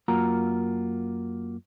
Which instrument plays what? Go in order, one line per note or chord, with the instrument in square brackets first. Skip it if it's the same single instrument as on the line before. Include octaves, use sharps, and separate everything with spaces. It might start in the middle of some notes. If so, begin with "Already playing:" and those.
[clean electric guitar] F#2 A#3 F4 F#4 A#5